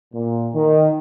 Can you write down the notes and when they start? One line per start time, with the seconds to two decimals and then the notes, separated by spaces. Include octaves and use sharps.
0.14 A#2
0.55 D#3